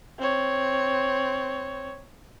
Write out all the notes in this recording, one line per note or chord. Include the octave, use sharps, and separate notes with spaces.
C4 C#5